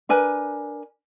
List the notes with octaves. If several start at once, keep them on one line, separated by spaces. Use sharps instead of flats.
D4 A#4 B4 G#5